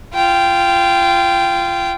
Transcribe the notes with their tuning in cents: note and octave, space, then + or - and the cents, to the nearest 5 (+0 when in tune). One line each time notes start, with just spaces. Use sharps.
F4 -20 G5 -5